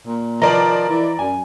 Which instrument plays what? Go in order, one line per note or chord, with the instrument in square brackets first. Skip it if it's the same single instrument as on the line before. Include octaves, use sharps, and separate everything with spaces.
[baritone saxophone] A#2
[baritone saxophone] F3 [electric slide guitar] A#4 B4 D#5 [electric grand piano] D5 A#5
[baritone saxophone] E3
[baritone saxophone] F#2 [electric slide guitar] G#5